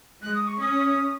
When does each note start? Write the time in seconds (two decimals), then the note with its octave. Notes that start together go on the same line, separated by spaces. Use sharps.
0.21 G#3 F#6
0.34 D#6
0.47 C#6
0.59 C#4 D#6